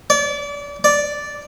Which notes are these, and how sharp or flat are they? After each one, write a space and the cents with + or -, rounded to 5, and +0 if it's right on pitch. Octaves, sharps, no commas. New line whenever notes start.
D5 -35
D5 -10